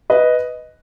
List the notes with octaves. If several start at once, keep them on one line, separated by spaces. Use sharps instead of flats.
B4 D#5